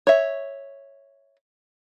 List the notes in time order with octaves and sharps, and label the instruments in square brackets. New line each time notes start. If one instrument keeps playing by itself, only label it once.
[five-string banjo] C#5 E5